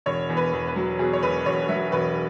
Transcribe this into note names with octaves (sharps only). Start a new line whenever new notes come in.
E1 C#5
E2
B4
E2
B4
F#3
B2 G#4
C#5
E1 B4
E1 C#5
F#3 E5
E1 B4